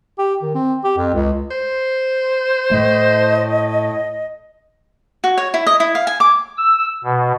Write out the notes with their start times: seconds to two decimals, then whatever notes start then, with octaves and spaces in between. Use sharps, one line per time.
0.19 G4
0.43 D#3
0.55 C4
0.84 G4
0.98 F2
1.14 C#2
1.51 C5
2.71 A2 A3 D#5
5.24 F#4
5.38 C#5
5.54 E4
5.66 D#5
5.80 E4
5.95 F5
6.07 G#5
6.20 D6
6.58 E6
7.04 B2